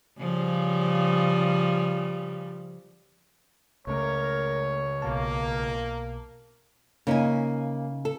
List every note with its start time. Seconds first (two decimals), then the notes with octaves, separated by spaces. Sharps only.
0.18 C#3 F3 G3
3.87 C#2 C#3 A3 A#4 C#5
5.02 B1 B2 A#3 A5
7.07 C#3 A#3 C#4 D#4 G#5
8.05 A4